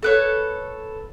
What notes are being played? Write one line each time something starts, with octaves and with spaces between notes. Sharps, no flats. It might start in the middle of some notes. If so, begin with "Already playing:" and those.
A4 B4 C#5